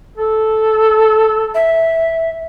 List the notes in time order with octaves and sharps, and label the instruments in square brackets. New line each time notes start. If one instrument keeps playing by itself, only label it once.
[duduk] A4
[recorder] E5